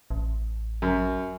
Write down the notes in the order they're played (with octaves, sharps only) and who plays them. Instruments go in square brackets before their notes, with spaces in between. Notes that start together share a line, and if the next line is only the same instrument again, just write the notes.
[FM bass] A1
[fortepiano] F#2